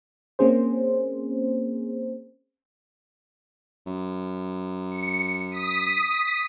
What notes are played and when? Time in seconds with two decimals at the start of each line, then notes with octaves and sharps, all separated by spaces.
0.39 A#3 C4 C#4 G#4 C5
3.86 F#2
4.89 C#7
5.50 D#6 B6